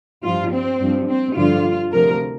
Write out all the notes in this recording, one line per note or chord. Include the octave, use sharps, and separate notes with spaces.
G2 F3 F4
C4
G2 F3
C4
G2 D3 F3 F4
D2 C3 F3 A#4